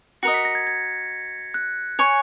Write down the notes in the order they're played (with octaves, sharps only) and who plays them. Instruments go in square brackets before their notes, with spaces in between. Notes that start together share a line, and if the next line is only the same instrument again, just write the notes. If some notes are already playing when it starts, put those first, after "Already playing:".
[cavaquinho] F#4 A#4 D#5 [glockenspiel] C#7
[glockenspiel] B6
A#6
G#6
G#6
F#6
[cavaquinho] C#5 G#5 C#6